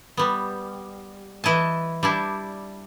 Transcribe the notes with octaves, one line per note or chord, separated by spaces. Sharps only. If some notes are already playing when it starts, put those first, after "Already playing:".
G3 B3
E3 E4 D#5 A5
G3 D4 E4